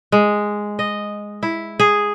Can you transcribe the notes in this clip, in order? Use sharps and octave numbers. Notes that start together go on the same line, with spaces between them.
G#3
D#5
E4
G#4